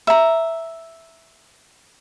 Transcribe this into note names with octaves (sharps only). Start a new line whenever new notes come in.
E5 A#5